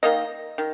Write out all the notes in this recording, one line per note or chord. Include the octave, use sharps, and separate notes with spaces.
D#3 A#3 D#5
D#3